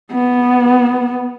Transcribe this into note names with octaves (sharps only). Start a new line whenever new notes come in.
B3